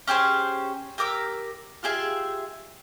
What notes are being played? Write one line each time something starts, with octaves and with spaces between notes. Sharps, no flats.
C#4 G4 G#4 C5
G4 A#4 D6 E6
F4 G4 G#4 E5